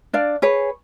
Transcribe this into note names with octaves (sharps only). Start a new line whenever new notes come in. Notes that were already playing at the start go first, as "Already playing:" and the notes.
D4 D5 F5
G#4 B4 C#5